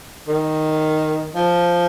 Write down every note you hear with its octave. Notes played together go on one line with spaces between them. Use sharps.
D#3
F3